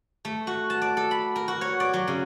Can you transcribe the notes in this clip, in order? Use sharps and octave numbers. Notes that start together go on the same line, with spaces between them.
A3
F#4
A5
D5
A4
B5
A#4
F#4
C#5
D5
F#3
C#3